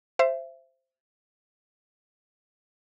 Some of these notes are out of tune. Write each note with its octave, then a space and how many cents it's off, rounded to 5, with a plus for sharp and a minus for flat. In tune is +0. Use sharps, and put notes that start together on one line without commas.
C5 +0 E5 +25